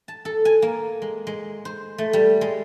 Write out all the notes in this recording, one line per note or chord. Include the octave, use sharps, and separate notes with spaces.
A5
A4
G#5
A#3
G#3
G#3
C5
A3
G3
G#3